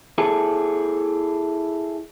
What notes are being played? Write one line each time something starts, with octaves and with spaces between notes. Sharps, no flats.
E4 G#4 A4